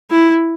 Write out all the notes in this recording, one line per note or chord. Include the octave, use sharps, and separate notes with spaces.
E4